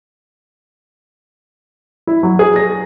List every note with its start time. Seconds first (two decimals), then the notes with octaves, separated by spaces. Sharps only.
2.07 E4
2.23 F#3
2.39 G#4
2.56 A#6